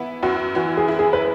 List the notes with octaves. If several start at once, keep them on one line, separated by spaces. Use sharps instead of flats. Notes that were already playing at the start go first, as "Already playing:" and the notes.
Already playing: E3 B3 E4
F#2 F#4
E3 F#4
G#4
E4
G#4
B4